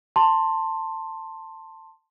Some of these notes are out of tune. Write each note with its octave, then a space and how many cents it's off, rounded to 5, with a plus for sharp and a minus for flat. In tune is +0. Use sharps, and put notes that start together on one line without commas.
A5 +15 C6 +10